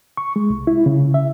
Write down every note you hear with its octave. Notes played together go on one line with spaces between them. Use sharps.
C#6
G#3
C2
E4
C#3
E5